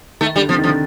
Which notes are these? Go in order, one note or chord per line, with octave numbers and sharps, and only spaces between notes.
D#3 A3
D3 G3
C3 F3
D#3
D3 F3